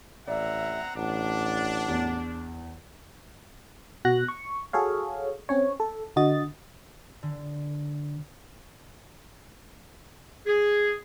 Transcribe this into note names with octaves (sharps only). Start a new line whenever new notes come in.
A1 C4 D5 E5 F#5 A#5
A1 D4 F#5
E2
B2 F#4 F#6 A#6
C#6
F#4 G#4 A4 C#5 F5
C4 C#4 C#5
A4
D3 F#4 D#5 A6
D3
G#4